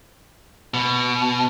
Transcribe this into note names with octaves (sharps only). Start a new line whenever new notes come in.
B2